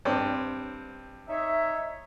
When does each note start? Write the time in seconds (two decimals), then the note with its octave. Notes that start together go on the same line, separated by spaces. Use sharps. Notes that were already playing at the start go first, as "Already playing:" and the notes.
0.05 G2 C4
1.28 D#4 C#5 E5